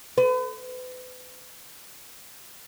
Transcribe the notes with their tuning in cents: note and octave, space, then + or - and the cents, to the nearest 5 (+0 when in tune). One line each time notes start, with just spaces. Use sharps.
B4 +40